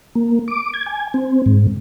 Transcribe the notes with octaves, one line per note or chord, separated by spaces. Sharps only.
A#3
D6
G#6
G#5
C4
G#2